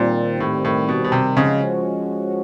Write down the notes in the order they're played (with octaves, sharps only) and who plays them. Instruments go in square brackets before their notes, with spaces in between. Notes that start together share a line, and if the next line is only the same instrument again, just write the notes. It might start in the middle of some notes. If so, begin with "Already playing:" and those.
Already playing: [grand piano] A#2 [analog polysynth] D#3 G3 C4
[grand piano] A2
A2
B2
B2
C3
[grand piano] C#3 [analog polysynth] F3 G#3 C#4 F#4